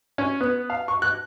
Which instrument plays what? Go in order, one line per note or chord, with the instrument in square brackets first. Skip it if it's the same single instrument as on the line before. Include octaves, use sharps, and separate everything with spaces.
[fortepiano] C#4
B3
F5
C#6
F#6